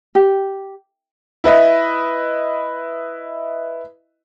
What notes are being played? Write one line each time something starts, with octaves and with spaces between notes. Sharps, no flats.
G4
E4 B4 D#5 E5